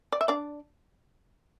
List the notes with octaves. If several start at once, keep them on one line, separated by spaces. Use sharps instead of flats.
D5
E5
D4 D5